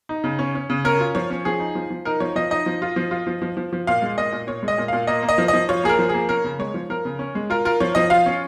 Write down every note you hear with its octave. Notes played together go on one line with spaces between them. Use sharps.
D#4
C#3
C#4
C#4
C#3
C#4 A#4
F4
F3 C#5
C#4
F3 G#4
D#4
F3
F3
D#4 A#4
F3 C#5
F3 D#5
D#4 D#5
F3
F4
F3
F4
F3
F3
F3
F3
A#2 F5
G#3
A#2 D#5
A#2
A#2 C#5
G#3
D#5
A#2
A#2 F5
A#3 D#5
A#3
D#5
F3
D#5
F3
F4 C#5
A#3 G#4
A#4
F3
A#3 G#4
C#4 A#4
C#3
G#3 C#5
F3
F3 A#4
C#3
C#4
G#3
F4 A#4
F4 A#4
F3 C#5
F3 D#5
F4 F5
C#4